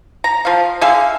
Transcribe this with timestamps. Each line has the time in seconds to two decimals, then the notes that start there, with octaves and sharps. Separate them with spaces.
0.24 A#5
0.45 F3 F5
0.81 D3 G#4 E5 F5